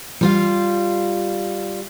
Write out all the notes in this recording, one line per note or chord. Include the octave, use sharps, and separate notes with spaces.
G3 F4 F5